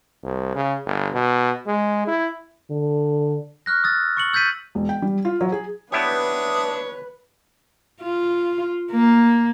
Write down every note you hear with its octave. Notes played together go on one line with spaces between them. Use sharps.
C2
C#3
G1
B2
G#3
E4
D3
C#6 F6 F#6 A#6
D#6 E6 A6
C#6 C#7 F#7
E6 G6 A6 B6 D#7
E1
G5
G3
F4
F#3
G#4
B3 D4 E4 G4 B4 C#5 E5 D#6
F4
A#3